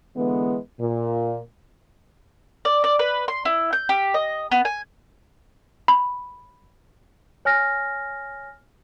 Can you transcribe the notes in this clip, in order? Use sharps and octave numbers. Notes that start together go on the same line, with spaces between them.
D3 E3 G#3 B3
A#2
D5
D5
B4
C6
E4
G6
G4
D#5
B3
G#5
B5
C#5 G#5 F6 A#6